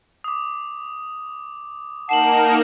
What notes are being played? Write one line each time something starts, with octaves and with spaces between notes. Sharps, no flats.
D6 D#6
A#3 D#4 A#4 F#5 A5 C7 E7 F#7